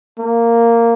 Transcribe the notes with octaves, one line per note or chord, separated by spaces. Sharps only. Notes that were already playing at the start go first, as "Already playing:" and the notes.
A#3